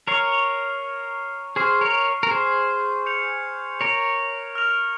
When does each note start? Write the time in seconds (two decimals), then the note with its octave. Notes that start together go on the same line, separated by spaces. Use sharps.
0.07 A#4 C#5 C#6 F6 C7
1.56 G#4 C5 C#6 F6 C7
1.81 A#4 C#5
2.23 A#4
2.31 G#4 C5
3.06 G6 C#7 F7
3.81 A#4 C#5
4.55 F6 A#6 F7